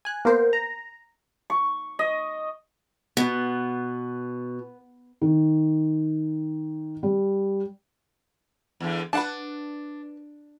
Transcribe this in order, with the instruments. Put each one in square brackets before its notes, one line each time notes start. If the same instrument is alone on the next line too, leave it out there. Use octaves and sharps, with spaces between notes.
[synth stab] G#5 F#6
A#3 B3 A#4 C5
A#5
[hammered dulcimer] C#6
D#5
[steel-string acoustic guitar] B2 [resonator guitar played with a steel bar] B3
[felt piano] D#3
G3
[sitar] E2 D3
[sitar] D4 [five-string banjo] B4 F#5 A5